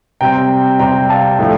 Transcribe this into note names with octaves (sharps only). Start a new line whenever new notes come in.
C3 G3 C4 G5 A#5
C3 G3 C4 G5 A#5
F5 A5
A2 F3 A3 D4